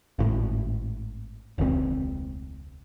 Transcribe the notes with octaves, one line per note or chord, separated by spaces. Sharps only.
G#1 A2
E1 C#2 C#3 C4